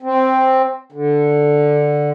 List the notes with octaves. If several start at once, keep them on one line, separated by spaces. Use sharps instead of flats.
C4
D3